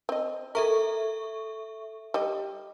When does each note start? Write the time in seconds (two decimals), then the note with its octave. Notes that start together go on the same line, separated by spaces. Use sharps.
0.09 C4 D#5
0.55 A4 A#4 E5 C#6
2.14 G3 D#5